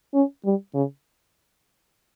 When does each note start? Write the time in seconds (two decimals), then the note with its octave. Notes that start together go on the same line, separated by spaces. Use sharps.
0.14 C#4
0.45 G3
0.74 C#3